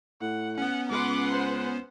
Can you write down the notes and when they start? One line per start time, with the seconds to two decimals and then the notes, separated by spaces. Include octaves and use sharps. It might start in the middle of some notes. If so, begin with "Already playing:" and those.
0.21 A2 F#5
0.58 B3 C#4 F#5
0.90 C#2 B4 F#5 C6 D6
1.31 C5